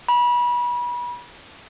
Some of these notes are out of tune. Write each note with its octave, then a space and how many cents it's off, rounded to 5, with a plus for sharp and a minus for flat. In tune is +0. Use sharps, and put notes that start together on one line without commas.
B5 -30